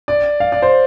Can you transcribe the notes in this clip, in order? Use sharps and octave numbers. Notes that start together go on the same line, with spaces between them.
D5
F5
D5
C5